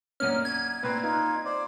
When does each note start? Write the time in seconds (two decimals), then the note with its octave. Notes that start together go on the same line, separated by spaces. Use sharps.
0.20 F#2 A#2 C#4 F6
0.45 G#6
0.83 A#2 C4 B4
1.03 D#4 F4
1.45 C5 D5